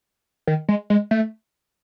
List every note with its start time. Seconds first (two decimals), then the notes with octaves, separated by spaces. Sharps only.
0.47 D#3
0.69 G#3
0.90 G#3
1.11 A3